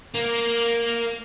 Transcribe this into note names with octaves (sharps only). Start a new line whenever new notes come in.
A#3